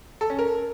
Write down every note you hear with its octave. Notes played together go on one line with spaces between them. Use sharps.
A4
C#4
A#4